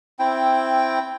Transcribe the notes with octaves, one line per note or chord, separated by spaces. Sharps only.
C4 E4 G5